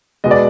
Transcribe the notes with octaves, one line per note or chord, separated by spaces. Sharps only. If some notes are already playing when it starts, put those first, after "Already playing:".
B2 G#3 B3 D#5
D5